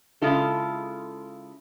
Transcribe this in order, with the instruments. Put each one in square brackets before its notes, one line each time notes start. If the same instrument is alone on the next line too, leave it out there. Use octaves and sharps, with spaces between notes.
[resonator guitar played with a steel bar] C#3 E3 G#3 E4 F4 A4